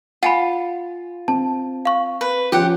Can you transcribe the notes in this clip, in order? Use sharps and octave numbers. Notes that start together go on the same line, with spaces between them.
F4 F#5 G#5 B5
C4 A5
F5 C#6
B4
F3 C#4 F4 G4 F#5